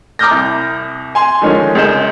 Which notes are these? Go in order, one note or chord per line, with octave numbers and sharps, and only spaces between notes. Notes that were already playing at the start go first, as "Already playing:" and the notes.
A#5 D6 D#6 F6 G6 A#6
C2
G#5 C6
D3 D#3 F3 G#3 C#4
C#2 F#2 G#4 A#4 G6 E7